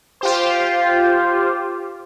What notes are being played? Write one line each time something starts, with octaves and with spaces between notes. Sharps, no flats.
F4 G4 C5